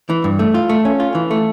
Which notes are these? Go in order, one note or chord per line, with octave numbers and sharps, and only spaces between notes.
E3
G2
A3
F4
A3
C#4
F4
E3
A3